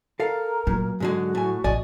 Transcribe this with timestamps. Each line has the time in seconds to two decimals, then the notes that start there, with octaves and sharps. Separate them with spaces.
0.20 A4 A#4 F5
0.67 A#2 F#3
1.00 G#2 D3 G#3 F#4
1.35 A2 G#5
1.64 A1 D5 D#5 G#5